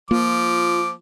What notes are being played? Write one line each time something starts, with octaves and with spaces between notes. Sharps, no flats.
F3 A#3 F4 D6